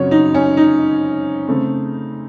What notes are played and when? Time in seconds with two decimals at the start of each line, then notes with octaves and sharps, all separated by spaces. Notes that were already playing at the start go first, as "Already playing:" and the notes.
Already playing: F#2 C#3 F#3 C4 C#5
0.11 D#4
0.34 C#4
0.57 D#4
1.47 C#3 A3 C4